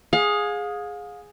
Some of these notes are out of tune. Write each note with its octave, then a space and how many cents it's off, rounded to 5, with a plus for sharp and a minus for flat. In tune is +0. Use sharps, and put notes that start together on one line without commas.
G#4 +0 F5 +35